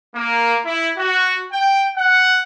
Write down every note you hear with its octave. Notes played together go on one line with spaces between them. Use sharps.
A#3
E4
F#4
G5
F#5